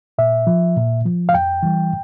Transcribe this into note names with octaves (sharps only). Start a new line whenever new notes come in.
A#2 E5
F3
A#2
F3
F5
F2 G5
E3 G3